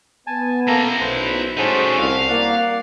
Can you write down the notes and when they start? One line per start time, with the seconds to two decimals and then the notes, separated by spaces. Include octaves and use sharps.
0.27 B3 G#5 A5
0.68 A#3 E4 A4 A#5
1.01 B1 B4 C5
1.57 A2 G3 C#4 D#4 F#4 G#4 A4 C5
1.98 C2 F5
2.29 A#3 D5 F#5